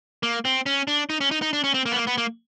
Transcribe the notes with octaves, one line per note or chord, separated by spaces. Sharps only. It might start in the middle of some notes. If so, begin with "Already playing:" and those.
A#3
C4
C#4
D4
D#4
C#4
D#4
D#4
D4
C#4
C4
A#3
B3
A#3
B3
A#3